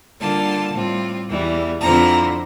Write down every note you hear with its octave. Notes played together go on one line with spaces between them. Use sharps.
D3 G3 A#3 F4 A5
A2 G3 C4 F4
E2 E3 G3
F2 D3 F3 C4 E4 A#5